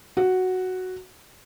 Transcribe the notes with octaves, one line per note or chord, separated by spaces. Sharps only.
F#4